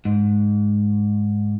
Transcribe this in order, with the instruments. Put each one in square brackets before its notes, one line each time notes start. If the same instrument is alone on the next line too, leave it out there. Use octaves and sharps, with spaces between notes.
[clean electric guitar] G#2